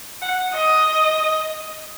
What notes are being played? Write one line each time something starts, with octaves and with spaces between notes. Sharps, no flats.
F#5
D#5